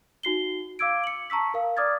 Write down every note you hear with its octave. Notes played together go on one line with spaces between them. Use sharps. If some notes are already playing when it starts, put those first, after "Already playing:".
D#4 F#4 C7 G7
F5 D6 E6 G#6 D7
C#7 F#7
A5 A#5 C#6 E6 B6
A#4 F5
D5 D6 D#6 F6 G#6 A6